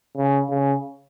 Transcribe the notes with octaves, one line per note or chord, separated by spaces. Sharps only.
C#3
C#3